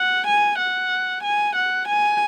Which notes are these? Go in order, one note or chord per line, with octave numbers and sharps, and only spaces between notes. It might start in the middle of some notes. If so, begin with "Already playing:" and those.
Already playing: F#5
G#5
F#5
G#5
F#5
G#5